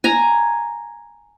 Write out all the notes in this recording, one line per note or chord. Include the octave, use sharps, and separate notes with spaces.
G#5 A#5